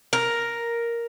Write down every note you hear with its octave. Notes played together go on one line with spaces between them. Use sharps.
A#4